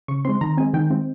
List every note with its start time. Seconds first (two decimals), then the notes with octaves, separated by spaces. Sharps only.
0.08 C#3 C#6
0.25 G#3 C4 C6
0.41 D#3 A#5
0.57 G#3 C4 G#5
0.74 D#3 G5
0.90 G#3 C4